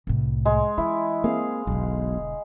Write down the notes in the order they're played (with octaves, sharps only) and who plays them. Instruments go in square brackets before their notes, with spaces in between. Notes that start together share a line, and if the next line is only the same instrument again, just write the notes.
[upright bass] C2 A2
[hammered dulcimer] G#3
[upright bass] E3 [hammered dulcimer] E4
[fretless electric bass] A#3 C4 [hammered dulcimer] G#4 F5
[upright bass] E1 D3 [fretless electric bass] B1